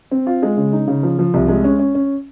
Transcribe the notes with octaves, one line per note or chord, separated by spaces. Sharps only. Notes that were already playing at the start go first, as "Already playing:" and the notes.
C4
F4
G#3
C#3
D#4
C#3
F3
F3
C2
G#3
C#4
C#4
C#4